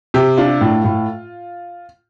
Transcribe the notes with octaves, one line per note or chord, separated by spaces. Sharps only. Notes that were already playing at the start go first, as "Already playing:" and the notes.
C3 G4
D4 F4
A2
A2